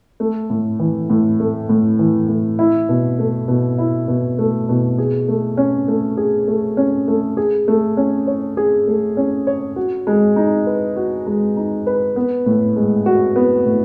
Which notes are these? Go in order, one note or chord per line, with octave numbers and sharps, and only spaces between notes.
A3
A2
E3
A2
A3
A2
E3
A2
E4
B2
A3
B2
E4
B2
A3
B2
G#4
A3
C#4
A3
G#4
A3
C#4
A3
G#4
A3
C#4
C#5
G#4
A3
C#4
C#5
F#4
G#3
D#4
B4
F#4
G#3
D#4
B4
B3
A2
G#3
F#4
B3
A2